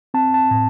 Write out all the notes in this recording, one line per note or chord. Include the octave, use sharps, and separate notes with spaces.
C4 A5
A5
A2